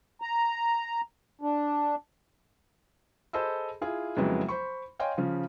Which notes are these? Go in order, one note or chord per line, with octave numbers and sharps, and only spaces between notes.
A#5
D4
G#4 A4 C5 D#5 B5 E6
E4 F4 G#4
F2 C#3 F#3 G#3 B3 E4
C5 B5 C#6
C#5 D#5 F5 G5 G#5 C6
C#3 F3 F4